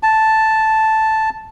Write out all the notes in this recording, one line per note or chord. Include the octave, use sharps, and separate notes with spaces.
A5